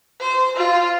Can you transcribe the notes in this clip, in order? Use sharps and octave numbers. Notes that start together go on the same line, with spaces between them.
C5
F4